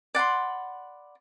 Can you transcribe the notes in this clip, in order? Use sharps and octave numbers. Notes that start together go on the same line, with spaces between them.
D5 F#5 B5 C6